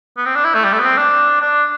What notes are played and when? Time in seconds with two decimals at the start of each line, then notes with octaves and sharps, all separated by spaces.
0.17 B3
0.26 C4
0.35 D4
0.45 E4
0.55 A3
0.64 G3
0.73 A3
0.79 B3
0.83 C4
0.97 D4
1.41 D4